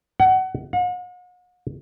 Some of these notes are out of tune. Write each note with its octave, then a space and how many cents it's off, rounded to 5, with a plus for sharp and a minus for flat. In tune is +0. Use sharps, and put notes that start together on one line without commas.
F#5 +25
F#5 -45